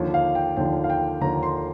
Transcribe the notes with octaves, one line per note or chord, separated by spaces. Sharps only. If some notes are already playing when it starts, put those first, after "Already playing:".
Already playing: D#2 D3 F3
F5
G5
D#2 D3 F3 G5
F5
G5
D#2 D3 F3 A#5
C6